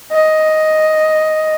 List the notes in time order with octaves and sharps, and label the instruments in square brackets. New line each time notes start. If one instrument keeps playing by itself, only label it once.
[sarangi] D#5